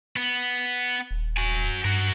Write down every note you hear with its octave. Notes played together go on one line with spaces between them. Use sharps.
B3
D#1
F#4 G#5
G2 F#4 A#4